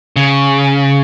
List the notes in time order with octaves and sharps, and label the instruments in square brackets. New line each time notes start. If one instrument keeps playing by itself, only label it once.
[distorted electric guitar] C#3